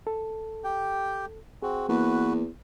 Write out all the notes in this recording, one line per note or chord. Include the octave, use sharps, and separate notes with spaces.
A4
G4 G5
C4 F#4 G#4
E2 A#3 F#4 B4